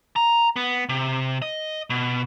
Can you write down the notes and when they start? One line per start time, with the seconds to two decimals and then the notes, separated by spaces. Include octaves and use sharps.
0.16 A#5
0.56 B3
0.89 C3
1.42 D#5
1.90 B2